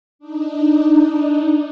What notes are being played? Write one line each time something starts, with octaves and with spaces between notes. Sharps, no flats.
D4 D#4